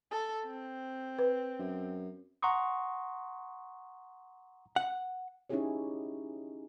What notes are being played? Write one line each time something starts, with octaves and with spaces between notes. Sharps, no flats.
A4
C4
B4
F#2
F#5 A#5 C6 C#6 D#6
F#5
C#4 D#4 E4 G4 G#4 C#5